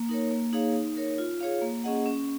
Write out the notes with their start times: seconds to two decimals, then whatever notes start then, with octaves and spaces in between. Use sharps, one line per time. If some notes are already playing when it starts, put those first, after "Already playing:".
Already playing: A#3
0.09 D#4 A#4 C#5
0.31 A#3
0.53 D#4 G#4 C#5 F5
0.75 D#4
0.97 A#4 C#5
1.18 F4
1.41 G#4 C#5 F5
1.62 A#3
1.84 C#4 G#4 D#5 F#5
2.06 C#4